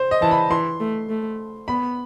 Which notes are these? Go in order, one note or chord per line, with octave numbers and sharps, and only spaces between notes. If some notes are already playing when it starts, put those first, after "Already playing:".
Already playing: C5
D#5
E3 A5
B5
E3 C6
A3
A3
B3 B5